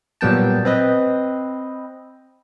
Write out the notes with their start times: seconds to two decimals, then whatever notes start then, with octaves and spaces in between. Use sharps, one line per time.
0.21 A#2 F#3 G3 B3 G5 A5
0.65 C4 B4 D#5